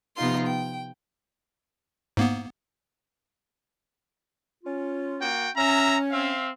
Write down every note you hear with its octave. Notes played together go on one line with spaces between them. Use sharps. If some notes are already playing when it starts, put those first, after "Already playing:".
C3 F3 B3 D#4 F4 C6
G5
G#2 A#3 B3
C#4 F4
A#3 F#4 G5
C#4 E5 A#5
C4 E5 F5